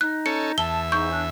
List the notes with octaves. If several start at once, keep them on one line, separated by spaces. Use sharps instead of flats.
D#4 F#6
C#4 A4 C#7
E2 E5 A5 G7
G#2 D#4 C#6 G6
C#4 D4